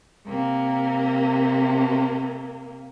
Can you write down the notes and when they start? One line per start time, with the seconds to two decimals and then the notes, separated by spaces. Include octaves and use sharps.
0.26 C3 A#3